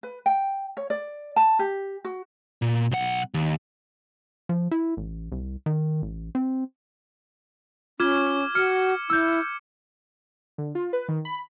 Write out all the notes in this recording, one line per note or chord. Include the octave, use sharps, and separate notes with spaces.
B4
G5
C#5
D5
A5
G4
F#4
A#2
B1 F#5
D#2
F3
E4
A1
C2
D#3
A1
C4
C#4 F4 D6 F6 G#6
F#4 F6 C#7
E4 E6 G6
D3
F4
B4
D#3
B5